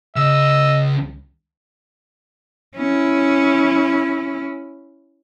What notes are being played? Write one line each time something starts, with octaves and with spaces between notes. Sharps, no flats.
C#2 C#3 D#5 E6
C#4 E4